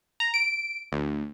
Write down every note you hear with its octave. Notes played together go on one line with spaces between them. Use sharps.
A#5
D7
D2